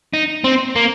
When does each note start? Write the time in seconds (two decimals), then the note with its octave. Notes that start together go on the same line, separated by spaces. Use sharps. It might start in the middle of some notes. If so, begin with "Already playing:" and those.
0.13 D#4
0.44 C4
0.76 A#3